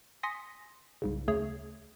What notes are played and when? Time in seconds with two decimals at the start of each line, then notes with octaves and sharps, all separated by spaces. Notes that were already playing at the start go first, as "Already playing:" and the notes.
0.23 G#5 C6 D#6 A#6 B6 C#7
1.02 C2 G#2 C#3
1.28 D2 C#3 A3 G#4 C#5 G#6